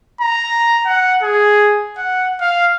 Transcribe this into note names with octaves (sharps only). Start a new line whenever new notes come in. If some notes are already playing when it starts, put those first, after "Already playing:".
A#5
F#5
G#4
F#5
F5